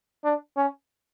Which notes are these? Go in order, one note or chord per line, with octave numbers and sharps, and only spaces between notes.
D4
C#4